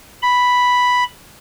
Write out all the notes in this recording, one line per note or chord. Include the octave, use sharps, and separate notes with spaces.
B5